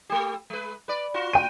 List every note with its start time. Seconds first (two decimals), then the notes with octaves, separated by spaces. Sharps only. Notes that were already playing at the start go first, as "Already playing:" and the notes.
0.10 A3 G4
0.50 G#3 B4
0.88 B4 D5
1.14 F4 F#4
1.33 G5 D#7